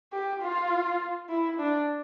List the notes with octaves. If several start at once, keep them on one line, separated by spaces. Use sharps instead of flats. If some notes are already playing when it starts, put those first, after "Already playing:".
G4
F4
E4
D4